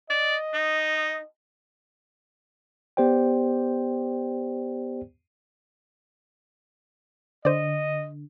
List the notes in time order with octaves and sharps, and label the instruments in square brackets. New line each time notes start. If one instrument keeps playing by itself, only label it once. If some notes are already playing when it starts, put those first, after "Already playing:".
[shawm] D5 [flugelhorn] D#5
[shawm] D#4
[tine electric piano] B3 G4 C5 D5 G5
[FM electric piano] D3 [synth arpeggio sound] C5 D5 [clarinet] D#5